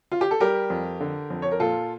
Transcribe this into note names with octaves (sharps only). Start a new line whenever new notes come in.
F4
G4
A4
G3 G4 A#4
F2
D3
F2
C#5
A#4
A#2 F4 A4